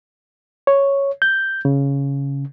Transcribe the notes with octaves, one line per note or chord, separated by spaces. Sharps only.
C#5
G6
C#3